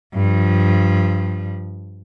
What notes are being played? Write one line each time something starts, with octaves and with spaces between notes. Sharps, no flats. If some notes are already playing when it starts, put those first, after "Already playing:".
G2 F3